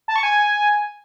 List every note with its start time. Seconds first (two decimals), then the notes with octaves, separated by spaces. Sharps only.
0.08 A5
0.16 C#6
0.23 G#5